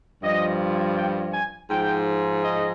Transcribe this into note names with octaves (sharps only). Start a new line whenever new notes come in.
G2 F3 D#5
G5
G#5
G#2 F3 G5
D#5